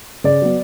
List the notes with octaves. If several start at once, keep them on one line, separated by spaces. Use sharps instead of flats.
C#3 D5
F#3 B3